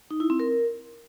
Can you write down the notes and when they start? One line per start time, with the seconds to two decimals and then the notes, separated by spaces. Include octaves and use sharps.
0.11 D#4
0.20 E4
0.30 C4
0.40 A#4